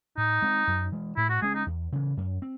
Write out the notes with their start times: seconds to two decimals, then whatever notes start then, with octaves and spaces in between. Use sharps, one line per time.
0.17 A2 D#4
0.42 G#3 C4
0.67 F#2
0.92 E3 G#3
1.16 A2 E4
1.29 F#4
1.42 G#3 C#4 G#4
1.55 D#4
1.67 E2
1.92 C#3 E3
2.17 F#2
2.42 C4